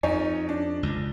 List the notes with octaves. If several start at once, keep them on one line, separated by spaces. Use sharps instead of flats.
F2 D#4 C#5
D4
C#2